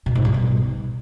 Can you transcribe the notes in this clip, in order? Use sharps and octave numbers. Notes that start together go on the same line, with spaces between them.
B2
G#2
G3
B2